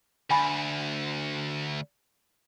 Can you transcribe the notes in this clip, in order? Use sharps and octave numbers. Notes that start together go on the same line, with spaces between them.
D2 G#5 B5